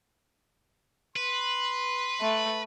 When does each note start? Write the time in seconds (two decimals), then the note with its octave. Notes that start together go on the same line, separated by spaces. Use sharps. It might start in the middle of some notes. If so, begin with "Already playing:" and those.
1.16 B4 C6
2.21 A3